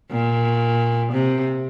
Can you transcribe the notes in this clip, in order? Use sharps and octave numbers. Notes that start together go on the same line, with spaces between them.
A#2
C3